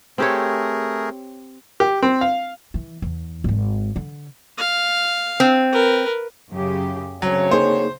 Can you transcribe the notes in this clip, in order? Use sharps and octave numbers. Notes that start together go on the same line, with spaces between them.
A3 C4 G4 G#4 A#4 C#5
G4
C4
F5
E3
E2
G#1 G#3
D3
F5
C4
A#4 B4
F#2 C#3 G4
D2 C#3 F#3 C4 C#5
A#3 D#4 G#4 C5